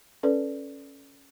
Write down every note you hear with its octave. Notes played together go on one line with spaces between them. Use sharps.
C#4 A4 B4 D5